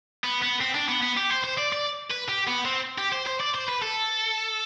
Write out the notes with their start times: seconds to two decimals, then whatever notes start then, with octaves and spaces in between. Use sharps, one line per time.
0.24 B3
0.42 B3
0.61 C4
0.75 D4
0.89 B3
1.02 B3
1.17 G4
1.31 C5
1.44 C5
1.58 D5
1.73 D5
2.10 B4
2.28 G4
2.47 B3
2.65 C4
2.98 G4
3.12 C5
3.26 C5
3.40 D5
3.54 C5
3.68 B4
3.82 A4